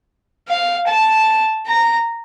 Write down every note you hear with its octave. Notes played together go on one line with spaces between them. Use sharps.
F5
A5
A#5